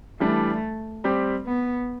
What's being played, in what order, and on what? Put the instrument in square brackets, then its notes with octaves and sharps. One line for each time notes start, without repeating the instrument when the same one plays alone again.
[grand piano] E3 G3 D4 [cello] A3
[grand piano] G3 C4 G4
[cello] B3